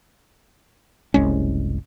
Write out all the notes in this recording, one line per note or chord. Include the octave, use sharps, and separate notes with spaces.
F#1 C2 G#3 C#4